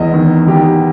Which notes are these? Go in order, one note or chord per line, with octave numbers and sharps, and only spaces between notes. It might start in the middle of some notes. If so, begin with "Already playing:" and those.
Already playing: E2 D#5
D#3
D#3 G4